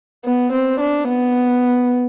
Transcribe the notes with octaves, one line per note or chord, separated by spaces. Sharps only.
B3
C4
D4
B3